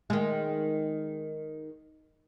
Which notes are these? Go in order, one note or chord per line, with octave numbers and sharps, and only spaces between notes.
D#3 G#3